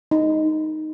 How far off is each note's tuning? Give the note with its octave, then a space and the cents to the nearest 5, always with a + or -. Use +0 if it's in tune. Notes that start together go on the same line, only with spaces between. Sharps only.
D#4 +0